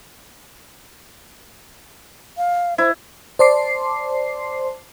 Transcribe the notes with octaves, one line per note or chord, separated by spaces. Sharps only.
F5
E4 C5
C5 D5 A5 C6 D6 C7